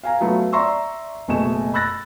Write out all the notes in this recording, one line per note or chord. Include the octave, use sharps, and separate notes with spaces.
F5 G#5 A#5
F#3 A3 B3 F4
D5 E5 A#5 C6 C#6 E6
F#1 B2 A3 G#5 E7
B5 E6 F#6 A6 A#6